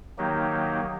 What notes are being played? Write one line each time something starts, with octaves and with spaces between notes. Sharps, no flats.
D#3 F#3 A#3 D#4 G4